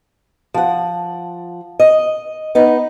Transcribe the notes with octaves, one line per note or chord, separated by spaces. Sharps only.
F3 F#5
D#5
B3 D#4